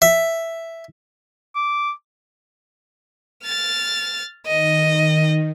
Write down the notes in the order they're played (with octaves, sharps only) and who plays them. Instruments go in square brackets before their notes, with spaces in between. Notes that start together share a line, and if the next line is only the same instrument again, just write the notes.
[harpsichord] E5
[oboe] D6
[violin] F6 A6
[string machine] D#3 [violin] D#5